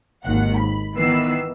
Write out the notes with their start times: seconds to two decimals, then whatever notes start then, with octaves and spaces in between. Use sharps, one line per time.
0.24 G#1 D#2 D#3 F#5
0.58 B5
0.94 D#3 E3 B3 B4 E6 C7